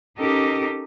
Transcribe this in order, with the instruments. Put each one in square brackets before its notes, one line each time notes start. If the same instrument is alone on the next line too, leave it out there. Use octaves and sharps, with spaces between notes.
[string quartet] C#4 D#4 G4 A4 A#4 D#5